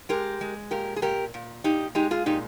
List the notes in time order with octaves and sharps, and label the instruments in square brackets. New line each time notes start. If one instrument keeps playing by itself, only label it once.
[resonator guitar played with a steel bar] G#3 G4 A#4
G#3
A#2 G4 A#4
G#4
A#2 G4 A#4
A#2
A#2 D#4 G4
G#3 D#4 G4
F4 G#4
A#2 D#4 G4